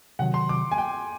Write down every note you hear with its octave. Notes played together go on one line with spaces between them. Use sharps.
C3 D#3 F#3 F#5
C6
D6
G#5
G5